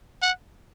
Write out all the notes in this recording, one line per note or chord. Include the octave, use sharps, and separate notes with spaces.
F#5